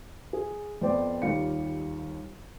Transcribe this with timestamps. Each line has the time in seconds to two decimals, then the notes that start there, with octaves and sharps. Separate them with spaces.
0.33 G#4
0.81 F2 B3 C5 D5 G5 D6
1.22 D#2 G3 F4 F5 C#7